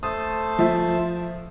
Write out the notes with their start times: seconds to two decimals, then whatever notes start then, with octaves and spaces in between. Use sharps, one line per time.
0.03 A3 C5 A5 D#6
0.59 F3 E5